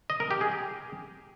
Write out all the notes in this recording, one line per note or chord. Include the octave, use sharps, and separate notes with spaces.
D#5
A#4
G4
G#4
G4